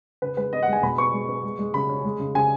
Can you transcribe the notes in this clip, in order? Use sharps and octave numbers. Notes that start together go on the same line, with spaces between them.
C#3 B4
G#3 B4
B3 D#5
F#5
G#3 G#5
B2 B5
B3 C#6
G#3
B3
G#3
G#3
C#3 B5
C#4
G#3
C#3
C#3 G#5